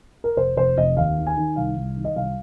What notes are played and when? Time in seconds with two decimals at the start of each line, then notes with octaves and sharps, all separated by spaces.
0.24 A#4
0.37 F1 C5
0.57 F1 C5
0.77 F1 D#5
0.97 D#2 F5
1.17 D#3
1.27 G#5
1.37 D#3
1.56 C2 F5
1.77 C2
1.97 D#3
2.05 D#5
2.16 C2 F5